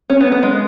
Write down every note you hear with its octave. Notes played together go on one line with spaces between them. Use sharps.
C#4
B3
B3
G#3